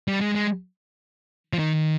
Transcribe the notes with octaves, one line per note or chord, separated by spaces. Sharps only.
G3
G#3
G#3
F3
D#3